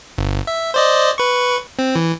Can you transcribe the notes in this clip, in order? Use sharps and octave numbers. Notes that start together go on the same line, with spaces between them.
G1
E5
C5 D5 D#5
B4 C#6
C4
E3